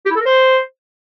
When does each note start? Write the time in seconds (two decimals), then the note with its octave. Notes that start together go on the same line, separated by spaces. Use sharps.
0.06 G4
0.11 E4
0.16 A4
0.21 A#4
0.26 C5